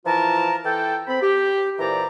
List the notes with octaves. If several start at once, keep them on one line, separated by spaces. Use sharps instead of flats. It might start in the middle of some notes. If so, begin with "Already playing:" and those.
E3 F3 F4 A#4 A5 A#5
E3 A4 G5
C4 B5
G4
A#2 E3 C5 D5 A#5